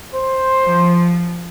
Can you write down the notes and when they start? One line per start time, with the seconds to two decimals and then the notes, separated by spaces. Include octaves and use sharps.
0.14 C5
0.63 F3